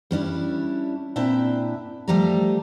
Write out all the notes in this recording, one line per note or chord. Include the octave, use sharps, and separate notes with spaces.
G3 C#4 D4 E4
A#2 C4 D4 E4 E5 G5
F3 G3 A3 G4 D5 A#5